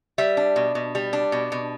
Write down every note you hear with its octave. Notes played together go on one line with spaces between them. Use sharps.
G3 E5
D4
B2
B2
G3
D4
B2
B2